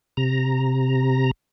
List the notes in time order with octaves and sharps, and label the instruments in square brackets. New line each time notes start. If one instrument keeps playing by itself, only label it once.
[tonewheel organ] C3 A#5